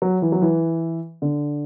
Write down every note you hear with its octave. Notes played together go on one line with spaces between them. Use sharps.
F#3
E3
F#3
E3
D3